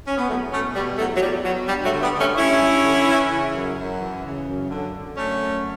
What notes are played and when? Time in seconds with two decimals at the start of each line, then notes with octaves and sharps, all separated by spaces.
0.07 C#4
0.17 B3
0.28 E2 F#3 A3
0.52 B2 A3 C#4
0.75 B2 G3
0.98 E2 F#3 A3
1.16 F#3
1.21 E2 G3
1.44 B2 F#3
1.68 G2 G3
1.85 F#3 A3
1.90 D3
2.02 G3 B3
2.14 D3
2.20 A3 C#4
2.38 G2 C#4 E4
2.61 G2
2.84 D3
3.07 E3
3.30 C#3
3.54 F#2
3.77 F#2
4.00 E3
4.23 C#3
4.47 F#2
4.69 D3
4.93 D3
5.16 F#2 A3 C#4
5.39 F#2